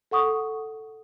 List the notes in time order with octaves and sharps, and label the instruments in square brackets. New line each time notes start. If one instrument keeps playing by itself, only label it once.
[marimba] A4 F#5 C#6 D#6